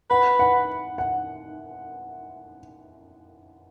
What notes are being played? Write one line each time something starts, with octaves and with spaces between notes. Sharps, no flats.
B4 F#5
F#5
F#5